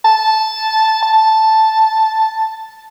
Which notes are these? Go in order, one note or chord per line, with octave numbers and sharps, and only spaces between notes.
A5
A5